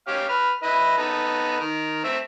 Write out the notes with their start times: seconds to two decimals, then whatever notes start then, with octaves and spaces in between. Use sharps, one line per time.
0.08 C#4 G4 F5
0.29 B4 F6
0.63 E4 B4 D#5
0.98 B3 D#4 A4
1.60 D#3 A#4
2.04 A3 C4 E5